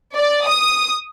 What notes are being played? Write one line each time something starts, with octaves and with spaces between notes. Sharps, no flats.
D5
D#6